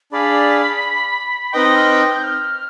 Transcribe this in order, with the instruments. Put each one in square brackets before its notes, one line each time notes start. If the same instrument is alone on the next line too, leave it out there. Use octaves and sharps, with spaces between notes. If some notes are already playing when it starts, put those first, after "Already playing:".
[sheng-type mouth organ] D4 G#4 D5 F5 [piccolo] B5
[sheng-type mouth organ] C4 D#4 B4 D#5 G5 [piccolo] D#6
[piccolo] F6
D6
D#6
G6
F6